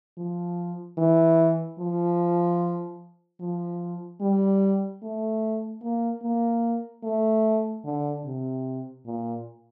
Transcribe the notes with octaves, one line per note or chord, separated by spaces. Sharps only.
F3
E3
F3
F3
G3
A3
A#3
A#3
A3
D3
C3
A#2